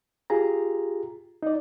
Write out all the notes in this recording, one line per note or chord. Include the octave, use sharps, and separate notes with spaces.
F4 G4 G#4 A#5
D#4 D5